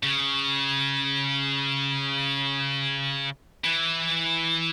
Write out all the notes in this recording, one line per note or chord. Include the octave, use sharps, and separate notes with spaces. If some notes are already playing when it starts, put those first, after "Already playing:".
C#3
E3